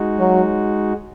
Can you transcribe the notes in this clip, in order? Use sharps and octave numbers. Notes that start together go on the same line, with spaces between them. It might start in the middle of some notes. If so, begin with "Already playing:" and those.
Already playing: G#3 D#4 F#4
F#3